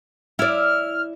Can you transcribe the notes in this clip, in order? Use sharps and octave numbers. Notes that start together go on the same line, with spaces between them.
E4 D5 F6